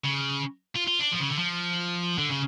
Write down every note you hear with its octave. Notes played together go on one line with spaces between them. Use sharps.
C#3
F4
F4
D4
F3
C#3
D3
F3
D3
C#3